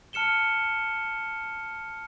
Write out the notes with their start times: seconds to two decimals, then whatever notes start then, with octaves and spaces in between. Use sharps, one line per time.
0.13 A5 F6 C#7 E7 G7